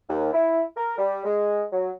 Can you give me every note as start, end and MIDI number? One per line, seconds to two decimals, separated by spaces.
0.09 0.32 39
0.33 0.63 64
0.76 0.97 70
0.98 1.21 55
1.25 1.63 56
1.72 1.90 54